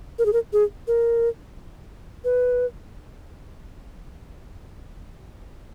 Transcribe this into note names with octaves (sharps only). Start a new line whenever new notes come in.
A#4
G#4
A#4
G#4
A#4
B4